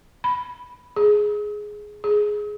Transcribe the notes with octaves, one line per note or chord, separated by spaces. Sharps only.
B5
G#4
G#4